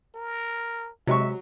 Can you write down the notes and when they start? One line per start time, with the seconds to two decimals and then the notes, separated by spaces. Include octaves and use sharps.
0.15 A#4
1.07 C3 F#3 G#3 E5 C#6